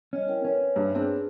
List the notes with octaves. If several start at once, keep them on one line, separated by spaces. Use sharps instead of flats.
G3 C#4 D#5
E4 A#4 G5
C#4 B4 C#5 E5
G2
B3 C4 D4 G#4